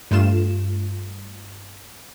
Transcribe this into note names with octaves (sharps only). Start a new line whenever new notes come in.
G2 A3 F4 E7